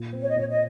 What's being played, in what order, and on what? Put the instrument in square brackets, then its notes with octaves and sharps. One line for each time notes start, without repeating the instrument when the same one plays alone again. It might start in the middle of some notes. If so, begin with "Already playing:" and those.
Already playing: [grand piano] A#2
C4
[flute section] C#5
D#5
[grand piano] A#2 [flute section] C#5
[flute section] D#5